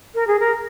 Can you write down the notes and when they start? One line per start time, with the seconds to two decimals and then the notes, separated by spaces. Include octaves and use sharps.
0.15 A#4
0.27 G#4
0.40 A#4